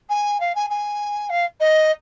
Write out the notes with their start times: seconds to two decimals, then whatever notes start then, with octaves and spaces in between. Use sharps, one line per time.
0.09 G#5
0.40 F5
0.55 G#5
0.69 G#5
1.29 F5
1.60 D#5